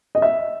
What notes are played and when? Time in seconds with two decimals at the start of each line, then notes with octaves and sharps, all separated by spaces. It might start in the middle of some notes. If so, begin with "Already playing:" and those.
0.15 D#5
0.22 E5